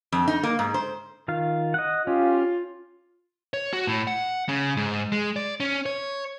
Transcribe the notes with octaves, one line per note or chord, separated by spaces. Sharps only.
F2
D#4
A#3
G#2
C5
D#3 F4 F5
D#5 F#5
C#4 F4 G4
C#5
F#4
A2
F#5
C#3
G#2
G#3
D5
C#4
C#5